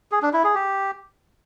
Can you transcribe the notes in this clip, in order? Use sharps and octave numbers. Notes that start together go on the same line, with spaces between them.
G#4
D4
E4
G#4
G4